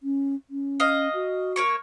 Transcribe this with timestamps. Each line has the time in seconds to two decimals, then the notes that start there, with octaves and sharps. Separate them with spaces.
0.03 C#4
0.50 C#4
0.80 D#5 F5
1.14 F#4
1.56 A#3 C#5 C#6